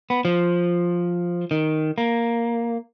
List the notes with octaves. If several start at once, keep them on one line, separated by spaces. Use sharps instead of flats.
B3
F3
D#3
A#3